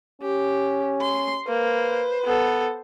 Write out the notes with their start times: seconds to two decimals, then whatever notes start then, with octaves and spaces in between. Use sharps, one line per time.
0.22 C#4 G4
1.01 C6
1.48 A#3 B4 C5
2.25 B3 A4